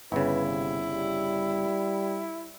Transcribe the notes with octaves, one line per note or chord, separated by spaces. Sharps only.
G1 C#3 E4 B4
C3
G3